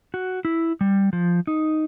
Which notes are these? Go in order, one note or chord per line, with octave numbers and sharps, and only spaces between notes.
F#4
E4
G3
F3
D#4